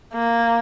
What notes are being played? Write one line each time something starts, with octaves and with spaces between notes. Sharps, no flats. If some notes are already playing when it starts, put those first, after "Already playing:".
A#3